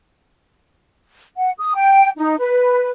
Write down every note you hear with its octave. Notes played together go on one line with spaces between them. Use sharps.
F#5
D#6
G5
D#4
B4